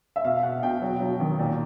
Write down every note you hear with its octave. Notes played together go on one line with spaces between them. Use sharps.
E5
B2 F5
B2 F#5
B2 G5
F#3
F#3
D#3
A#2